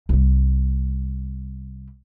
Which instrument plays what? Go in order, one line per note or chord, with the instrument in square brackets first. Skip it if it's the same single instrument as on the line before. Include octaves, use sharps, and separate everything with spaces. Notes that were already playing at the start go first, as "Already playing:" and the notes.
[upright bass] C2 G3